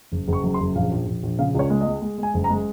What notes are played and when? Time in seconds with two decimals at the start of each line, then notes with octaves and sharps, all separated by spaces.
0.12 F#1
0.28 F#1
0.33 C#6
0.44 F#2
0.54 C6
0.60 F#1
0.75 A#1 F5
0.92 A#1
1.07 A#1
1.23 A#1
1.39 C#3 F5
1.55 C#2 C#5
1.70 G#3
1.81 D#5
1.86 G#3
2.02 G#3
2.18 G#3 G#5
2.34 F#1
2.44 A#5
2.50 G#3